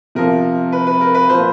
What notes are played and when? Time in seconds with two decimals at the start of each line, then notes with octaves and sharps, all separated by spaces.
0.15 C3 F3 A#4
0.72 B4
0.87 B4
1.01 A#4
1.15 B4
1.29 A#2 F3 C5